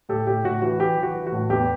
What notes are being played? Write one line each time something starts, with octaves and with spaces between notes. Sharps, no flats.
A2 G4 A4
A2 G4
A2 F#4
E3 F#4
E3 G4
E3
F#4
E3
F#4
A2
E2 G4